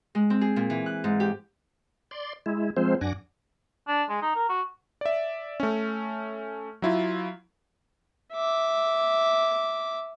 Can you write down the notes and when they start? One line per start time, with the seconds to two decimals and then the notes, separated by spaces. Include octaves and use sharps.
0.15 G#3
0.30 C4
0.41 G#4
0.56 A#2
0.70 E3
0.86 F#6
1.04 G#2
1.20 G4
2.11 D5 C6
2.46 G#3 E4
2.77 F3 G#3 C4 C5
3.01 F#2 D4 F#5 G#5 D6 A#6
3.88 D4
4.09 G#3
4.22 D#4
4.36 A#4
4.49 F#4
5.01 D5 E5
5.60 A3 C#4
6.82 F#3 E4 F4
8.33 E5 D6